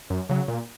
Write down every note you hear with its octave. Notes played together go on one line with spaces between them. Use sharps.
F#2
C#3 F#3
A#2